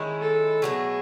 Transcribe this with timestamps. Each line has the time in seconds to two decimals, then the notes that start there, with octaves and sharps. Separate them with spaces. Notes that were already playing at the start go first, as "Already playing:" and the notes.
Already playing: D#3 G#3 C#4 E4
0.21 A4
0.62 B2 F#3 A3 G#4